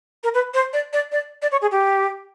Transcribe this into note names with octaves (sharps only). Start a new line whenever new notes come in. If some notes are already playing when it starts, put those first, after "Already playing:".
A#4
B4
C5
D5
D5
D5
D5
C#5
G#4
G4